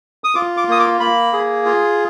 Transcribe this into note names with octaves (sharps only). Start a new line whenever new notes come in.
D#6
F4 D6
D6
A#3 D#6
D6
A#3 B5
G#4
F4